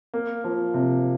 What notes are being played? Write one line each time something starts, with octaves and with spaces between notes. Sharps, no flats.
A#3
F3
C3